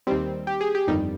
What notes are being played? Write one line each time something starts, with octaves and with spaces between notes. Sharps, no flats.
D#2 D#3 G3 C4
G4
G#4
G4
G1 F2 D#3 G3 D#4